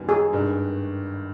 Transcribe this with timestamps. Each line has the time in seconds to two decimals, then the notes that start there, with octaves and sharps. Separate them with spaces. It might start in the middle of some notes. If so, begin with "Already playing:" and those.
Already playing: F#1 F#2 D#3 G3 B3
0.09 G#4
0.32 G#1 G2 D#3